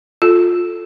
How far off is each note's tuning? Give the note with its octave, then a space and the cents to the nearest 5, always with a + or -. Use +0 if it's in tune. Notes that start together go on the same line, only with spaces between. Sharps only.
F4 +20 A4 +0